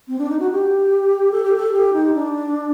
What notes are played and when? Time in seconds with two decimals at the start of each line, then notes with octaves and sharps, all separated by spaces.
0.08 C4
0.19 D4
0.29 D#4
0.39 F#4
0.51 G4
1.32 A4
1.43 G4
1.56 A4
1.73 G4
1.93 D#4
2.13 D4